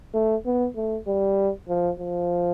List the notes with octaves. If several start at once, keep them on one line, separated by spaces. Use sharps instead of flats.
A3
B3
A3
G3
F3
F3